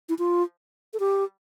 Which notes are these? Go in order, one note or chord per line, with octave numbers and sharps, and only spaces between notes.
E4
F4
A4
G4